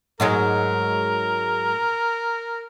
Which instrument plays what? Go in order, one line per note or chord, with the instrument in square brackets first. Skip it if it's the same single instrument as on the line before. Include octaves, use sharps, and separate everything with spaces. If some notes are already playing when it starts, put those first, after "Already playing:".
[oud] G#2 F#3 G#3 [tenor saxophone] A#4